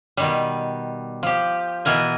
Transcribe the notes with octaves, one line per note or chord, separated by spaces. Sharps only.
B2 D#3 G3
F3 G4
B2 E3 A#4 G#5